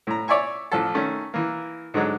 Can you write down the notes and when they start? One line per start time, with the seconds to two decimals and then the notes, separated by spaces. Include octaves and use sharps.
0.07 A2 A#5
0.28 C#5 D5 E5 G#5 C#6
0.72 A1 F3 A4
0.95 D#3 A3 C#4
1.34 E3 A#3
1.94 G#2 D3 F#3 G#3